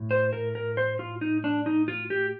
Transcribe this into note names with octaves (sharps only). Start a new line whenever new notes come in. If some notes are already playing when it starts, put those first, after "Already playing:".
Already playing: A2 A3
C5
A#4
A#4
C5
F4
D#4
D4
D#4
F4
G4